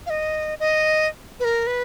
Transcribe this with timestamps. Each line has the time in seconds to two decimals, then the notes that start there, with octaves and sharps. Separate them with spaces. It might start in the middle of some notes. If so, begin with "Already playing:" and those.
0.06 F5
0.10 D#5
0.60 D#5
1.40 B4
1.45 A#4
1.67 B4